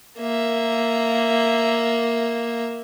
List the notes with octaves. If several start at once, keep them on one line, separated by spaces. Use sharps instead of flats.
A#3 E5